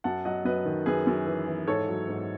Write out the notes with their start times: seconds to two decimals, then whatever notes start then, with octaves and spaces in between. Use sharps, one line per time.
0.04 F#2 F#5 A5
0.25 F#3 D#5 F#5
0.45 F#2 B4 D#5
0.65 D#3
0.86 F#2 G#4 B4
1.07 F#2
1.27 E3
1.47 E3
1.67 G#2 A4 C#5
1.88 F#3
2.09 G#2